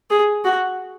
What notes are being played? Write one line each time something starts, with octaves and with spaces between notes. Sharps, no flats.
G#4
F#4